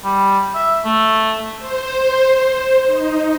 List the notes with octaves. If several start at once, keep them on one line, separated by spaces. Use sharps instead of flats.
G3
E5
A3
C5
D#4